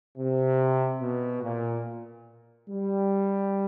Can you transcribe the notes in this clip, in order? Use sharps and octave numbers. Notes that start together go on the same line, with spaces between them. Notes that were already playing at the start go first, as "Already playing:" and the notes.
C3
B2
A#2
G3